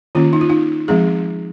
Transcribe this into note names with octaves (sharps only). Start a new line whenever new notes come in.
D#3 A#3 C#4 F4
D#4
F4
D#4
F3 G#3 C4 G#4